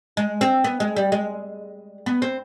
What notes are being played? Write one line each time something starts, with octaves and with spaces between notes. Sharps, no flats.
G#3
C4
B3
G#3
G3
G#3
B3
C4